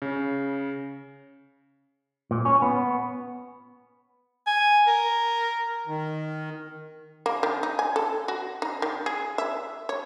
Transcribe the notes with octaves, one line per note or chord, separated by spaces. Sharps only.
C#3
A#2
C#4
B3
G#5
A#4
D#3
A#3
D#3
D#4
G#5
A4
F#4
D#4
D#3
G#4
E5
C#5